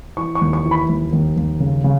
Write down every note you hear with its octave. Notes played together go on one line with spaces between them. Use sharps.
E3 C#6
C#6
D#2
C#6
E3
B5
D#2
D#2
D#2
C#3
C#3